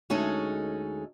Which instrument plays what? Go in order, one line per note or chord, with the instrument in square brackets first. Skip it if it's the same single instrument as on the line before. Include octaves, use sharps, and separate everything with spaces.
[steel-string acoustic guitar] D2 G#3 C#4 D#4 G#4 A4